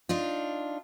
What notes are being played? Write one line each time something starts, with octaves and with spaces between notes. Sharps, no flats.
D4 D#4 F4